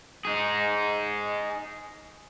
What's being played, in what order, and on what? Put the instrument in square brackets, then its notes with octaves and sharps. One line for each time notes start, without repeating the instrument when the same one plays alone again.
[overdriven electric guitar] D#4 G#4